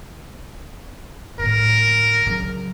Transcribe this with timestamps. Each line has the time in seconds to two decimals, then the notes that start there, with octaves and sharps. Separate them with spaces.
1.39 A2 D3 A#4
2.26 C#3 F#3